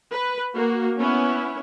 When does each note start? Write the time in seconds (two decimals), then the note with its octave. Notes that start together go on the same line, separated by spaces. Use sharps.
0.12 B4
0.54 A#3 F#4
0.97 B3 C#4 E4